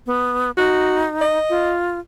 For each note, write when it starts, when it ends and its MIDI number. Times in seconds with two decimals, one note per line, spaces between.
0.07 0.51 59
0.58 1.38 63
0.58 1.06 66
1.21 1.73 75
1.50 1.99 65